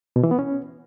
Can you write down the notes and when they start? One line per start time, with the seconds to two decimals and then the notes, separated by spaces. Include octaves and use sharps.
0.16 B2
0.24 E3
0.31 B3
0.39 C#4